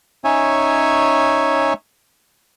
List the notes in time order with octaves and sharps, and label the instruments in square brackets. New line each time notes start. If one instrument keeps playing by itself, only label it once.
[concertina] C#4 D#4 C#5 E5 G#5